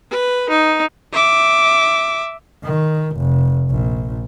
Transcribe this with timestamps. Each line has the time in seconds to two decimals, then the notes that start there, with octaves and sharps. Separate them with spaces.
0.11 B4
0.50 D#4
1.12 E5 D6
2.63 D#3
3.17 F1
3.70 A#1